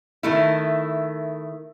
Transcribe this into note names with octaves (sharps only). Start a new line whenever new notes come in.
D#3 A3 E4